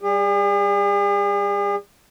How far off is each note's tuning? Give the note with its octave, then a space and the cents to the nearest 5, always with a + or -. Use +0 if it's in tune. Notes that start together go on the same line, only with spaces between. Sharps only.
G3 +0 G#4 -45